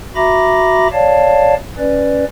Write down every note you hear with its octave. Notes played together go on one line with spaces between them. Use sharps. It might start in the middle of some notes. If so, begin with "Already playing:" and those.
F#4 E5 A#5 B5 D6 A#6
C#5 D5 F5 A5
C#4 B4 D5